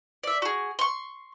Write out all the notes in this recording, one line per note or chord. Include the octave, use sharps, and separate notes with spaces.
D5 E5
F#4 G#4
C6 C#6